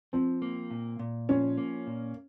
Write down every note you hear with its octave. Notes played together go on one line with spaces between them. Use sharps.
F3 C4
A#3
A#2
A#2
F3 C#4
A#3
A#2